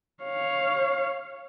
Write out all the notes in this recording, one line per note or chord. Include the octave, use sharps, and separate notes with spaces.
C#5 F5